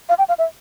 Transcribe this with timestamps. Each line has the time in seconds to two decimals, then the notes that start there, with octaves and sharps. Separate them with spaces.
0.09 F5
0.18 G5
0.29 F5
0.38 E5